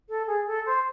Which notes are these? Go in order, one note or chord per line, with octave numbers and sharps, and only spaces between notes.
A4
G#4
A4
C5